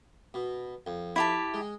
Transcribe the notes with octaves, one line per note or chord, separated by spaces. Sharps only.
B2
F2
E4 G4 A5
G#3